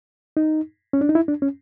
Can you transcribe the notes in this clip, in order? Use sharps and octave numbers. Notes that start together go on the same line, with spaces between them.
D#4
C#4
D4
D#4
E4
D4
C#4